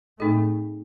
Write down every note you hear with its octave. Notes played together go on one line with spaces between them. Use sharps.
A2 A3 C4 D#4 G#4 D#5